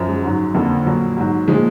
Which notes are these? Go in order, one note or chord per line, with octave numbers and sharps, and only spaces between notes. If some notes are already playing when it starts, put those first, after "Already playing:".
Already playing: F#2 F3
G#3
G#2 F#3
F2 D3 F3 A#3
A#2 F#3
G#2 F#3
A#2 F3 G#3